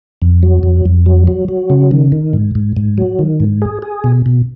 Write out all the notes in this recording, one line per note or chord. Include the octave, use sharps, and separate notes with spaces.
F2
F#3
F2
F2
F#3
F#3
F#3
C#3
D#3
D#3
G#2
G#2
G#2
F#3
D#3
G#2
G#4
G#4
B2
B2